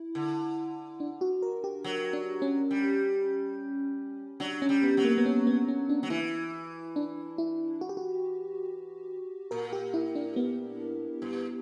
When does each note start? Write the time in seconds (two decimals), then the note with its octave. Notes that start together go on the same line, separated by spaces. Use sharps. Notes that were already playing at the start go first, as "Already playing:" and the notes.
Already playing: E4
0.15 D3
1.00 D4
1.21 F#4
1.42 A#4
1.64 G4
1.84 F#3
2.13 D4
2.42 C#4
2.71 G3
4.40 F#3 D4
4.62 C#4
4.69 G3
4.83 B3
4.97 F#3
5.05 A#3
5.18 B3
5.26 C#4
5.47 B3
5.68 C#4
5.89 D4
6.03 F#3
6.10 E3 E4
6.96 D4
7.38 E4
7.81 F#4
7.89 G4
7.97 F#4
9.51 A#2 A#4
9.73 G4
9.94 E4
10.15 D4
10.36 B3
11.22 G2